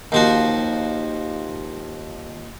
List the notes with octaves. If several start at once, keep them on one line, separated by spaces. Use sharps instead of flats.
D#2 F3 F#4